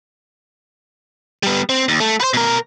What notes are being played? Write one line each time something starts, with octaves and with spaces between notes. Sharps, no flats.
G3 B3
C4
D#2
A3
B4 C5
B2 A#4